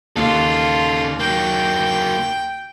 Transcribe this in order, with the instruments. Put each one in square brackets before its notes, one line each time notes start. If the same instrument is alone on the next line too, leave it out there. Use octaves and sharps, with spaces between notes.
[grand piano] D#2 [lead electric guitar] C#3 A4 [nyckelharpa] F4
[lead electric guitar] F#3 A#3 [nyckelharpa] G5